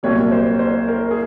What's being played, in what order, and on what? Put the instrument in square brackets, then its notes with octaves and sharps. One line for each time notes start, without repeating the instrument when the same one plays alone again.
[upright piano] C2 A#2 F#3 A#3 C#5
C5
C5
A#4
G#4